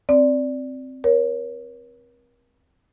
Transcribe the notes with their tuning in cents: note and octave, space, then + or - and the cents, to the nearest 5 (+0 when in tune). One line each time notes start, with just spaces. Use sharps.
C4 +0 D5 -5
A#4 +40 C#5 +0